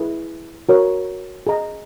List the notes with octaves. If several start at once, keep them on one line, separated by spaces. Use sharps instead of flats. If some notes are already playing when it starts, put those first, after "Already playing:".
Already playing: E4 G#4 B4
F#4 A#4 C#5
G#4 D#5 A#5